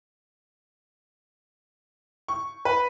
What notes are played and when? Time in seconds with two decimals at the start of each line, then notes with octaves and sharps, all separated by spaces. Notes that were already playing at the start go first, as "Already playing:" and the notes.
2.28 C#6
2.65 B4